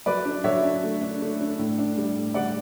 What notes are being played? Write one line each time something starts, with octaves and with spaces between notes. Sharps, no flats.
F#3 B4 D5
D4
F#3 C#5 E5
D4
A3
D4
A3
D4
A2
D4
G3
A2
G3 D5 F#5